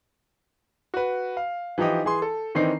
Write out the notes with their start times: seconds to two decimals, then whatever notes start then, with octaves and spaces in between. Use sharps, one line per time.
0.94 F#4 B4
1.37 F5
1.78 E3 F3 D#4 G4 D#5
2.05 E3 G#4 C6
2.22 A4
2.55 D#3 E3 C4 D4 D#4 C7